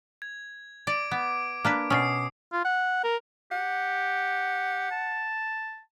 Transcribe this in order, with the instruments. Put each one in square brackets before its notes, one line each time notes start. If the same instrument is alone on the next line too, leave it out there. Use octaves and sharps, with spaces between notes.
[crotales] G#6
[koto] D5 [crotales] D6 D7
[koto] B3
A#3 D4 B4
[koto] B2 C#4 [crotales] D#6 C7
[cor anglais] F4
F#5
A#4
[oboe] G4 [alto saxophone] F#5
[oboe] A5